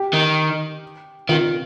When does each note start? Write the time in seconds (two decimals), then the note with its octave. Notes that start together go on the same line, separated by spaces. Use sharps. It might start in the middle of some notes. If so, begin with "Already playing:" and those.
Already playing: G4
0.13 D#3
1.29 D#3 F4